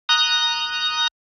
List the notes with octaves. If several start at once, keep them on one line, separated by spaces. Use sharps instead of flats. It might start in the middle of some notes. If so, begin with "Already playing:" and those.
A#5 D#6 F#6